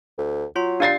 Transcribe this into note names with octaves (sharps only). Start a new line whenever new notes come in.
D2
F#3 F4 C6
D4 G4 D5 F5 A6 C7